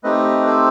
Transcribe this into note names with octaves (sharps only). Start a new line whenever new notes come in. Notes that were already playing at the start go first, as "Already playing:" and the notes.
A3 C4 D#4 G4 B4 D#5
A4 C5